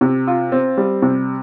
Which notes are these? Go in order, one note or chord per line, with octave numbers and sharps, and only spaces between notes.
C3
F4
C4
G3
C3